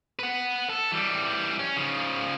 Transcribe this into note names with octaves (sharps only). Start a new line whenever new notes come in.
B4 F#5
A4
E3 G3
C#4
C#3 F3